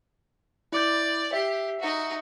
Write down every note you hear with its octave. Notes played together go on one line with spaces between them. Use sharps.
E4 D5 D6 G6
G4 E5 C7
D#4 F#4